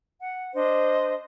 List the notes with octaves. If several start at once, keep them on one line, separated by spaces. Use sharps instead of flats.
F#5
D4 C5 D#5